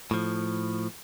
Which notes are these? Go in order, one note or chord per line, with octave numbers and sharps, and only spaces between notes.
A2 F3